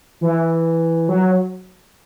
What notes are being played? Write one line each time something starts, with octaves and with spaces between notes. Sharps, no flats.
E3
F#3